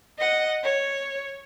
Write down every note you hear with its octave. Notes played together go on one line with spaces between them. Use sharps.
D#5 F#5
C#5